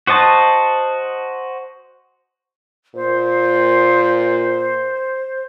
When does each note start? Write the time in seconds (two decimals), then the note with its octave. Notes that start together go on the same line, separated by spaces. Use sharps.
0.07 F#4 C5 D#5 A5
2.95 A#2 C5